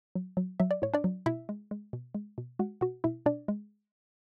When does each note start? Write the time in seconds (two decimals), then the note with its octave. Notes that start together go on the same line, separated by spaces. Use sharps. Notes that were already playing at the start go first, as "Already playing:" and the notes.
0.15 F#3
0.37 F#3
0.60 F#3 E5
0.71 D5
0.82 A2 C#5
0.94 D4 D5
1.04 F#3
1.26 B2 E4 E5
1.49 G#3
1.71 G#3
1.93 B2
2.15 G#3
2.38 B2
2.59 G#3 F#4 F#5
2.81 B2 F#4 F#5
3.04 B2 E4 E5
3.26 B2 D4 D5
3.48 G#3